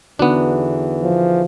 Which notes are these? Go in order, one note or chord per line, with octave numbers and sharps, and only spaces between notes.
E2 D3 E3 B3 D4 D#4 F#4
F3